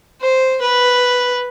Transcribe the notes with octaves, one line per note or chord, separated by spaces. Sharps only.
C5
B4